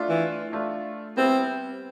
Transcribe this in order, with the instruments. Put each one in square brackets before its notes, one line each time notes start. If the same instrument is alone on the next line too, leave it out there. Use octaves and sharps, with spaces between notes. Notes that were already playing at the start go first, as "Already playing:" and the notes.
Already playing: [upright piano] A3 D4 F4
[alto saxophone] E3
[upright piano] A3 D4 F4
[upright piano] G3 B3 E4 [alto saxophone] C4